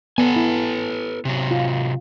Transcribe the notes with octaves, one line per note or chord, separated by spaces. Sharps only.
B3 A4 B4 G#5
E4
C3 F#3
F4